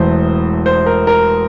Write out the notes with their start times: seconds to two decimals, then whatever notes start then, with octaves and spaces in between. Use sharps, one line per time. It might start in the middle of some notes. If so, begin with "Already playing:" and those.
Already playing: E1 E2 E3 A3 C5
0.66 C5
0.86 A#4
1.07 A#4